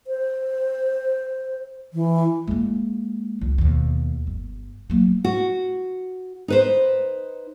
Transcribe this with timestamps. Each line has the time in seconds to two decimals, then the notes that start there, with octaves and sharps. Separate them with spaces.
0.07 C5
1.94 E3
2.48 G#3 A#3
3.41 C#2
3.58 D#2 B2
4.27 G1
4.90 F#3 A#3
5.24 F#4
6.48 D#4 B4 C5